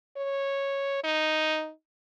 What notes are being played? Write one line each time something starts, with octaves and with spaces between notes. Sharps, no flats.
C#5
D#4